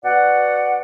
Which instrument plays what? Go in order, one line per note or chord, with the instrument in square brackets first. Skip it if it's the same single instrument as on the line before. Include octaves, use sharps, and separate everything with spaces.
[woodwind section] B2 D5 F#5